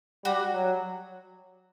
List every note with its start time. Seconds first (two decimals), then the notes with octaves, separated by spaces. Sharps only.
0.25 G3 F#4
0.53 F#3